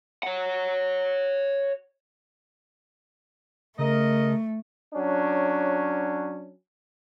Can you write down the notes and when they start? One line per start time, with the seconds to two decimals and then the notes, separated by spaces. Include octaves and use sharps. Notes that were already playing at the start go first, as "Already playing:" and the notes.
0.23 C#5 F#5
3.79 C#3 A3 A#4 D#5
4.94 F#3 C#4 D4